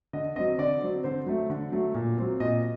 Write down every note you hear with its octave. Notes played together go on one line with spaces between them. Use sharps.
D3 D#5
F#3 C4 D#5
D3 D5
F#3 C4
D3 C5
F#3 A3
D3
F#3 A3
A#2
F#3 C4
A#2 D#5